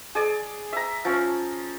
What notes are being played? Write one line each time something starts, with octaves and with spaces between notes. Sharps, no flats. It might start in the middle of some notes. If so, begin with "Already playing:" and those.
G#4 D5
E5 A#5
F3 C#4